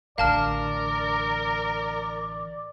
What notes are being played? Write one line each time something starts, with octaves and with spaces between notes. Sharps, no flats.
A1 D3 A#4 D5 F5 A5 F6